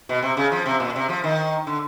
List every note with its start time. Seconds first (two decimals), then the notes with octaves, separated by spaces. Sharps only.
0.09 B2
0.23 C3
0.37 C#3
0.52 F3
0.66 C3
0.80 A#2
0.96 C3
1.09 F3
1.24 D#3
1.67 D3